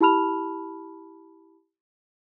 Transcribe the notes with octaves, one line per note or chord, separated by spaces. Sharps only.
E4 G4 A5 B5 F6 F7